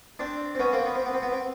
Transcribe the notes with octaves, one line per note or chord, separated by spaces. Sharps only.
C4 D4
C4
B3 C#4
A#3 C4
B3
C4
B3
C4
B3
C4